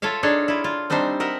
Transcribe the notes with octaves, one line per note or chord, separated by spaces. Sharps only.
F4 A4 C#5 E5 F5
D4 D#4 G#4 A4 C#5
E4 F4
F4
G3 C4 D4 D#4 C5
A#4 D#5 E5 F#5